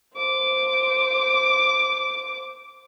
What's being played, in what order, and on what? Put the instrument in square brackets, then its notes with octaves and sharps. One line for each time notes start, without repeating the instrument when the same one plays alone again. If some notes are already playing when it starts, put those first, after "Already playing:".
[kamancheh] C5 D6